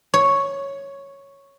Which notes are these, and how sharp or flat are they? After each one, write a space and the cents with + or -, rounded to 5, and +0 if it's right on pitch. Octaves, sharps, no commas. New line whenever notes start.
C#5 +0